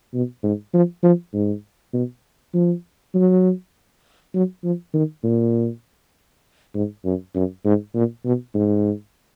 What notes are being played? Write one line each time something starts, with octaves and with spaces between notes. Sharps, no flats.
B2
G#2
F3
F3
G#2
B2
F3
F#3
F#3
F3
D#3
A#2
G#2
F#2
F#2
G#2
A#2
B2
G#2